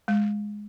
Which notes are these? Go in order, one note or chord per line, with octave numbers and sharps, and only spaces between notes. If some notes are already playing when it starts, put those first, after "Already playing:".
G#3